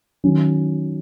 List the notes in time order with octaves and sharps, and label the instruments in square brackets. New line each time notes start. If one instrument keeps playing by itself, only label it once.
[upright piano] D#3 F#3 C#4